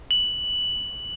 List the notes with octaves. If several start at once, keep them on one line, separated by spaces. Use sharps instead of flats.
F#7